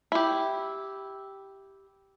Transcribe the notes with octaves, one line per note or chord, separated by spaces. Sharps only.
E4 G4